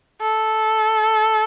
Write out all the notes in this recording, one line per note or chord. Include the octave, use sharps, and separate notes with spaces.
A4